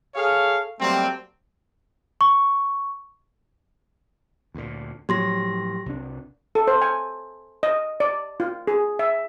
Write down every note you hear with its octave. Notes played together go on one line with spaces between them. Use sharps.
G#4 A4 C#5 F5
F#3 G3 A3 A#3 C4
C#6
D2 A#2
A2 F3 F#3 G4 C6 A#6
C2 D4
A4
C5
G#5
D#5
D5
F4
G#4
E5